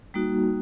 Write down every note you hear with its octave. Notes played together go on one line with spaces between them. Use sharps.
G3 A#3 D#4 F#4